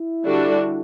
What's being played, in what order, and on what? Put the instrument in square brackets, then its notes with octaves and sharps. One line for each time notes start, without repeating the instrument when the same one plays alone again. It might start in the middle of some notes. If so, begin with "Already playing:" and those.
Already playing: [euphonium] E4
[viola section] D3 G3 D4 F#4